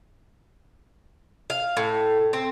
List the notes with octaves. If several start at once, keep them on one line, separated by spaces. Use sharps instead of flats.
F5
A2
C4